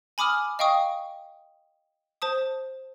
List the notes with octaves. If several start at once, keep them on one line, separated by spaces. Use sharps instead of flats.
G#5 B5 D6 D#6 F6
D#5 F5 G5 C#6 D#6
C5 A5 D#6